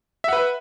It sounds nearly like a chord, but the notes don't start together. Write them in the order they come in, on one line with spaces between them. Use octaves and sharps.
E5 F#5 B4